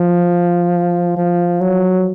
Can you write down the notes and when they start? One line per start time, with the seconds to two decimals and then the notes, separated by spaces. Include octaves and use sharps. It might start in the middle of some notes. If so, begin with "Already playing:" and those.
Already playing: F3
1.17 F3
1.61 F#3